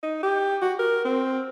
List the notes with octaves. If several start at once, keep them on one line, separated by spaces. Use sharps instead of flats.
D#4
G4
F#4
A#4
C4